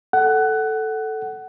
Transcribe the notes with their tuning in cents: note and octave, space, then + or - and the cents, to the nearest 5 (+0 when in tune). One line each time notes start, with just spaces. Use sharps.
A4 +0 F#5 +15